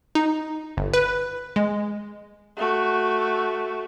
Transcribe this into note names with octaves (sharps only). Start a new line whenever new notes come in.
D#4
G1
B4
G#3
A3 F#4